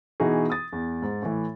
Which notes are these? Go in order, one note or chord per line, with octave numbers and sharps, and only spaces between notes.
B2 E3 D#4 F#4 G#4
D#6 A6
E2
G#2
A2 E3